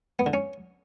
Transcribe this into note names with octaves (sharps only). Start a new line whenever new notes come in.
B3
D3
C#4